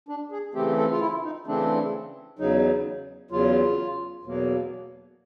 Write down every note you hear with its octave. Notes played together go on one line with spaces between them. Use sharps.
D4
G#4
C#3 E3 A3 C4 G4
A4
F4
E4
D#4
C#3 E3 A3 C4 D4
E2 C#3 F#3 D#4
E2 C#3 F#3 F4
E2 B2 F#3 A#3